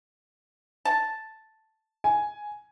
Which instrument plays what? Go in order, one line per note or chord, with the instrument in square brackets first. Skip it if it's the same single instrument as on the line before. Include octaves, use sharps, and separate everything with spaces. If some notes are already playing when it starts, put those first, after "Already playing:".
[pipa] A5
[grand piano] G#5